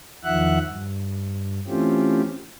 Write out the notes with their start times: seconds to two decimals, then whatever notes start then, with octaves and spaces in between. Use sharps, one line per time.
0.24 E2 D#3 F3 E5 F#5 F#6
0.67 G2
1.67 E3 A3 C4 C#4 F4 G4